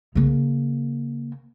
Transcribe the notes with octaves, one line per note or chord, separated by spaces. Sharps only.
C#3 A#3